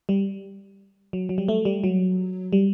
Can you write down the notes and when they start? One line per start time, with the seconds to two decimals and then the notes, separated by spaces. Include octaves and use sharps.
0.09 G3
1.13 F#3
1.29 F#3
1.38 G3
1.48 A3
1.65 G3
1.84 F#3
2.53 G3